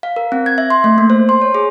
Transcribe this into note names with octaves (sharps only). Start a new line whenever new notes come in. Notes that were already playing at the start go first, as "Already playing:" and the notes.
F5
A#4
C4
G#6
E5
C6
A3
A#3
C5
C6
C#5
G#4